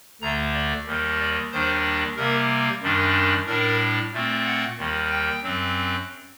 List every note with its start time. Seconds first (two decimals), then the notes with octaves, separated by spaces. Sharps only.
0.21 D2 D3 A3 A#5
0.54 D5
0.86 D#2 D#3 G3
1.19 D5
1.52 D#2 D#3 G3 D4 C5
2.17 C3 G3 A#3 A#4
2.82 F#2 D#3 G3 D4
3.47 A2 G3 D4 A#4
4.13 A#2 A3 C4
4.45 F#5
4.78 D#2 D#3 G3
5.11 G5
5.43 F#2 F#3 C4